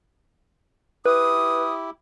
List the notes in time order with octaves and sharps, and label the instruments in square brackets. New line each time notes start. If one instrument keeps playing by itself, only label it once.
[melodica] E4 G4 [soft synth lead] B4 [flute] D#6